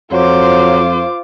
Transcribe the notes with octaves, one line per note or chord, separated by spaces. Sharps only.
F2 F#3 F4 C5 D6